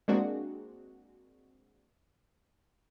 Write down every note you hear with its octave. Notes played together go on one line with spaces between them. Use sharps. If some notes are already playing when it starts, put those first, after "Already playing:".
G#3 A#3 C4 D4 F#4